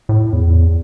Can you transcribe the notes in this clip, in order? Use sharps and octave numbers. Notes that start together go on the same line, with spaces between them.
A2
E2